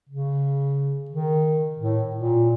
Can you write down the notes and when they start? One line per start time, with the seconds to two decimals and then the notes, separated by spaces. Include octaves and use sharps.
0.09 C#3
1.10 D#3
1.78 A2
2.16 A#2